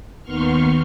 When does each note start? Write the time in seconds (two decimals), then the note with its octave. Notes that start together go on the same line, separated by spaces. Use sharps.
0.23 D#2 D#3 B3 C6 C#6 F6